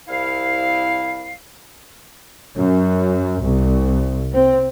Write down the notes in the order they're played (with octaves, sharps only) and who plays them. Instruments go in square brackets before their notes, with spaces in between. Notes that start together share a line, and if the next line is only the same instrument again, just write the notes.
[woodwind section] C2 E4 F5
[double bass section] F#2
C2
C4